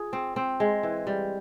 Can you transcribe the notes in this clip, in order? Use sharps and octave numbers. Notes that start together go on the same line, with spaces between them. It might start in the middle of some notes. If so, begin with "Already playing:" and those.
Already playing: F4 G#4
C4
C4
G#3
E3
G3